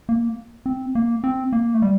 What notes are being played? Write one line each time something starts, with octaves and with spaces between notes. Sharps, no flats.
A#3
C4
A#3
C4
A#3
A3
G3